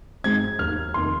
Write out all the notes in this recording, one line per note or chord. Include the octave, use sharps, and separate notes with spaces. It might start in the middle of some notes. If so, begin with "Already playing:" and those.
G#2 G#3 C4 G#6
D#2 D#3 A#3 F6
F1 D#3 A#3 C6